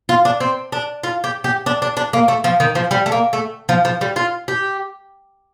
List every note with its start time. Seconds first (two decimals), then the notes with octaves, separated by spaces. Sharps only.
0.09 F4
0.25 D4
0.40 C4
0.72 D4
1.03 F4
1.24 G4
1.44 G4
1.66 D4
1.82 D4
1.97 D4
2.13 A#3
2.28 A3
2.44 F3
2.60 D#3
2.75 F3
2.91 G3
3.06 A3
3.12 A#3
3.33 A3
3.69 F3
3.85 F3
4.01 G3
4.16 F4
4.48 G4